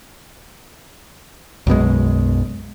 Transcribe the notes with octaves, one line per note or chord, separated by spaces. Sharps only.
B1 F#2 B2 G#3